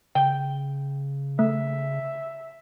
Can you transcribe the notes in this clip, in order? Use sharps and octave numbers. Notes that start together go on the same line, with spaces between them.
C#3 G5
A3 E5